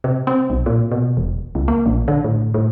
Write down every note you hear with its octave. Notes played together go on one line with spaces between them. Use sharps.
C3
C4
B1
A#2
B2
E1
C#2
A#3
A#1
D3
A2
A2